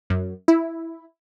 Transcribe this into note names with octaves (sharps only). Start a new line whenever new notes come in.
F#2
E4